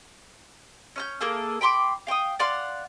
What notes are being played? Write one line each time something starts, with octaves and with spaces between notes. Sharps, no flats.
C#4 F6 G6
A#3 G#4 A4
G5 B5 C6 D6
F5 G5 C#6 D#6
D5 F5 F#5 C6